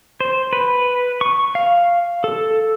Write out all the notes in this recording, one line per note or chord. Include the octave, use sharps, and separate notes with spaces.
C5
B4
C#6
F5
A4